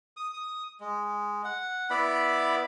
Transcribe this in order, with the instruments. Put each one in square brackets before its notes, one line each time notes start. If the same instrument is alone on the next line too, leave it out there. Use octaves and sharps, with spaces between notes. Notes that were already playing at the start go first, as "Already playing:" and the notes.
[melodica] D#6
D#6
G#3
F#5
B3 E4 D5 B5